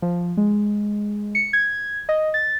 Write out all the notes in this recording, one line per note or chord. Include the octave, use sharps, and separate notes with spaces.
F3
G#3
C#7
G#6
D#5
A6